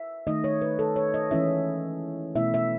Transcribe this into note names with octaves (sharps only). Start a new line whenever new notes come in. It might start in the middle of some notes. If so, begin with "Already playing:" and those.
Already playing: E5
D#3 A3 D#4 D#5
C#5
B4
A4
C#5
D#5
E3 G#3 C#4 E4 E5
B2 A3 E4 E5
E5